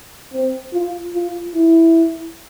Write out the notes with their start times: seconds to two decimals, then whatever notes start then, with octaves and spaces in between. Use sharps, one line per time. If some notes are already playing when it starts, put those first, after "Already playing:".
0.33 C4
0.73 F4
1.15 F4
1.55 E4